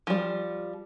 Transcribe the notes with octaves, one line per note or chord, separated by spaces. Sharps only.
F3 G3